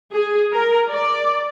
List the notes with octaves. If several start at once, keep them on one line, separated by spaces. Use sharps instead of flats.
G#4
A#4
D5